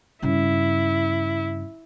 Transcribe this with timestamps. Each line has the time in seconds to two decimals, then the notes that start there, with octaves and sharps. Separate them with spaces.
0.22 G2 C#3 E4